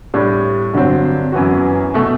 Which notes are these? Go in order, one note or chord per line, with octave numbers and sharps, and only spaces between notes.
A2 G3 D4
G2 D3 F#3 C4
F#2 E3 B3 F#4
B2 A3